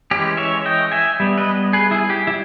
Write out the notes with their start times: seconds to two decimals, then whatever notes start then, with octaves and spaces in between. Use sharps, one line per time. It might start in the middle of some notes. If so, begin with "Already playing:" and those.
0.11 E3 G#3 C#4 G4
0.37 C#5 E5
0.65 D#5 G5
0.92 E5 G#5
1.20 G3 B3
1.38 B4 D#5
1.73 G#4 B4
1.91 E4 G#4
2.10 G4
2.27 G3 E4